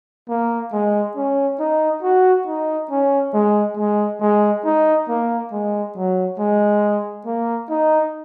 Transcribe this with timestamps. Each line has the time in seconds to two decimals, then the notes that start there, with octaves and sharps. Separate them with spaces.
0.29 A#3
0.72 G#3
1.16 C#4
1.60 D#4
2.03 F#4
2.47 D#4
2.90 C#4
3.34 G#3
3.77 G#3
4.21 G#3
4.65 D#4
5.09 A#3
5.52 G#3
5.96 F#3
6.39 G#3
7.26 A#3
7.69 D#4